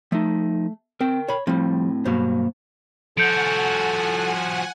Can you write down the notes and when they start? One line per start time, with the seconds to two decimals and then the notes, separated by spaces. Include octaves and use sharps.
0.12 F3 A3 D#4
1.01 C4 A#4 G5
1.28 C#5 B5
1.47 A2 F3 G3 C4
2.05 G2 B2 F#3 A#3 C5
3.18 F3 F#4 A4 F#5 G#5 G6 C#7 D7